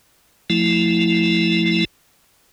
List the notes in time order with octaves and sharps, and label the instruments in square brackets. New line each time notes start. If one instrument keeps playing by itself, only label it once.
[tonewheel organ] F3 A3 E4